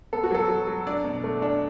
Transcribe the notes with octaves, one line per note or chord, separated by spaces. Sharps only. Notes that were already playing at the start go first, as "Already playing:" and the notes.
B3 A4
F#4
F#3 A4
F#3
F#3
D4 D5
B2
A3
D4